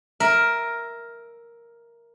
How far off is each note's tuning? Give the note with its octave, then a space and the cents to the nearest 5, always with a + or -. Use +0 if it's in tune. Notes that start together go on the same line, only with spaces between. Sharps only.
A#4 +5 E5 +0